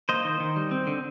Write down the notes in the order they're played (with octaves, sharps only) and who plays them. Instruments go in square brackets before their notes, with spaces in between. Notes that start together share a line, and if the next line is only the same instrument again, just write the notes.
[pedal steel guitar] A#3 C5 D#5
D#3
D#3
G3
C4
D3